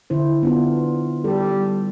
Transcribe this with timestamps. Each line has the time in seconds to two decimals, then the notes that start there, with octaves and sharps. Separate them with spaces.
0.10 D3 E4 C5
0.43 B3 D4 F4
1.24 G3 A4